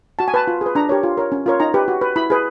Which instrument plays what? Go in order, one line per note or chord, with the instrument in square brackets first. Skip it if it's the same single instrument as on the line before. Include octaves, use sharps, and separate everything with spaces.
[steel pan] F#4 A5
G#5
B4 A5
F4
G#4 B4
D4 A#5
G4 A#4 C#5
F4
A#4 C#5
C#4
F4 A#4 C#5
D#4 A#5
G4 B4
F#4
B4
E4 B5
G#4 B4